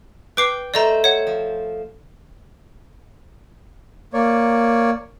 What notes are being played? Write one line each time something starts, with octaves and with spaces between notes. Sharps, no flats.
B4 G5 D6 C7
A3 C5 D5 D#5 A#5
C#5 F#5
F3
A#3 C#5 D5